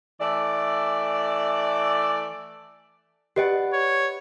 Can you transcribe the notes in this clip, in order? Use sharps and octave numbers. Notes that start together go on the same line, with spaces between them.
E3 A3 D5
G4 B4 D5 D#5 F#5
C#5